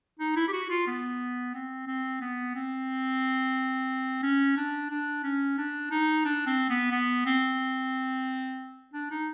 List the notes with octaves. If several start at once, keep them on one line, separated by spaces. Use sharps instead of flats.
D#4
E4
G4
F#4
F4
B3
C4
C4
B3
C4
C#4
D4
D4
C#4
D4
D#4
D4
C4
B3
B3
C4
D4
D#4